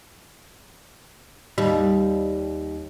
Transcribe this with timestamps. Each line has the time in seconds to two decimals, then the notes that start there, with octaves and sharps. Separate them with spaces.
1.58 D#2 G3